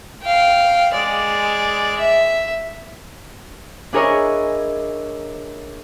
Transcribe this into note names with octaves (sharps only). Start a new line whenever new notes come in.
F5 G5
G#3 D5
E5
D4 E4 G#4 A#4 C#5 D#5